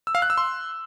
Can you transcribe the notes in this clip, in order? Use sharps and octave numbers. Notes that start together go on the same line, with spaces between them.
E6
F5
F#6
E6
C6